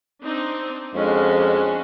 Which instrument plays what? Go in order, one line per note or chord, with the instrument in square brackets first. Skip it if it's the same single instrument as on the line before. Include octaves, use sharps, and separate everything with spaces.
[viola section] C4 D4 D#4
[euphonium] F2 [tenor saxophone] G#3 [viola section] C#4 D4 F#4